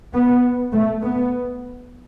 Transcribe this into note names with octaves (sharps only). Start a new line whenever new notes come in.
B3
A3
B3